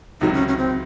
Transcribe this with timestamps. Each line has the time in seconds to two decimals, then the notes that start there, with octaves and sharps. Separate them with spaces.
0.21 C#2 C3 D#3 F#3 D#4
0.33 C#4
0.48 C#4
0.58 C4